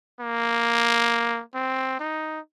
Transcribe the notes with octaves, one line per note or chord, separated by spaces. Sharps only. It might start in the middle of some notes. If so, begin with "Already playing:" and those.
A#3
C4
D#4